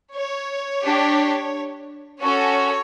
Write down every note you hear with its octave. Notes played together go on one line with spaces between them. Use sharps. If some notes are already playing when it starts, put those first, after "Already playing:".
C#5
D4 G4
C#4 F#4 A4 C#5